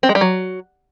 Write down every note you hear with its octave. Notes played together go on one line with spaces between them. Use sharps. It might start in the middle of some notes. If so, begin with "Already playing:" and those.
C4
G#3
G3
F#3